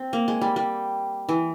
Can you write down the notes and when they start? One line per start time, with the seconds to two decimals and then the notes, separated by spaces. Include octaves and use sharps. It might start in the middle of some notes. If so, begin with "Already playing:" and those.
Already playing: C4
0.13 A#3
0.28 G#3
0.41 G3
0.56 G3
1.29 E3